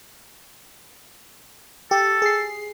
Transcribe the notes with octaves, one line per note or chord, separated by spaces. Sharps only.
G4 A4
G#4 C7